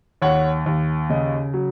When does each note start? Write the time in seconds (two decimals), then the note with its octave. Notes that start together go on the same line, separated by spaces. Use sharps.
0.22 D#2 C#5 F#5
0.66 D#2
1.10 C#3 D#5
1.54 F#3